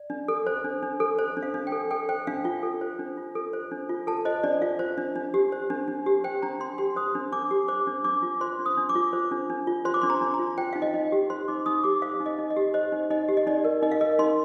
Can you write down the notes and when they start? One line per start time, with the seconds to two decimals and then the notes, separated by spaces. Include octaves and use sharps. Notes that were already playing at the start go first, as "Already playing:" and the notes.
Already playing: D5
0.10 D4
0.28 A4
0.47 C5
0.64 D4
0.83 D4
1.00 A4
1.19 C5
1.37 D4
1.43 F5
1.54 D4
1.67 G5
1.72 A4
1.91 A4 G5
2.09 C5 G5
2.27 D4 F5
2.44 F4 G5
2.63 A4
2.81 C5
2.99 D4
3.17 F4
3.35 A4
3.53 C5
3.71 D4
3.89 F4
4.07 A4 A5
4.25 C5 D#5
4.43 D4 D5
4.62 F4 F5
4.79 C5
4.98 D4
5.16 D4
5.34 G4
5.52 C5
5.70 D4
5.88 D4
6.06 G4
6.24 C5 G5
6.42 D4 A#5
6.60 D4 C6
6.78 G4 C6
6.96 C5 D#6
7.15 D4
7.32 D4 D6
7.51 G4
7.68 C5 D6
7.87 D4
8.04 D4 D6
8.23 F4
8.41 C5 C6
8.59 D4
8.66 D#6
8.77 D4
8.89 D6
8.95 F4
9.13 C5
9.32 D4
9.50 D4
9.67 F4
9.85 C5 C6
9.94 D6
10.01 D4 C6
10.10 A#5
10.21 D4
10.34 A#5
10.39 F4
10.58 C5 G5
10.73 D#4 F5
10.82 D#5
10.94 D#4
11.12 G4
11.30 C5 C6
11.48 D#4 D6
11.66 D#4 D#6
11.84 G4 D6
12.02 C5 F5
12.20 D#4
12.26 D#5
12.38 D#4
12.50 D#5
12.56 G4
12.74 C5 D#5
12.92 D#4
13.10 D#4 D#5
13.29 G4
13.37 D#5
13.47 D#4 D5
13.64 A#4
13.83 D#4 D#5
13.92 F5
14.01 A#4 D#5
14.19 D#4 C6